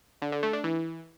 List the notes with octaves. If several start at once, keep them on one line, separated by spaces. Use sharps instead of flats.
D3
D3
A3
D4
E3